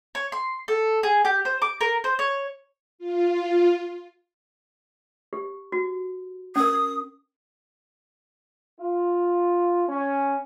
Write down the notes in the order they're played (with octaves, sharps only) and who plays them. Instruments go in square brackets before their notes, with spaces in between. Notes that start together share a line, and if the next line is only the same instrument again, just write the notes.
[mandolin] C#5
C6
A4
G#4
G4
C5
D6
A#4
C5
C#5
[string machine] F4
[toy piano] G4
F#4
[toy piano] C#4 A#4 [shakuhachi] D#6
[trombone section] F4
C#4